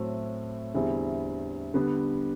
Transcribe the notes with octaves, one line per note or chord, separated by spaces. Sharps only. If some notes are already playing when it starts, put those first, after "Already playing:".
Already playing: A2 F#3 A3 C4
E2 D3 G3 C4 E4
D3 G3 B3